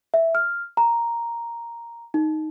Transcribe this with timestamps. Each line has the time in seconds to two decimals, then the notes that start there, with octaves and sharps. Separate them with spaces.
0.14 E5
0.35 F6
0.77 A#5
2.14 D#4